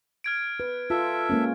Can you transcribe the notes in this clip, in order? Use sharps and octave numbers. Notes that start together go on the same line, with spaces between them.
F6 G#6 D7
B4
F4 A4 E5
G#3 A#3 C#4